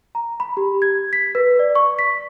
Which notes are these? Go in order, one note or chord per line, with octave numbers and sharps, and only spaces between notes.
A#5
B5
G4
G#6
B6
B4
D5
C#6
B6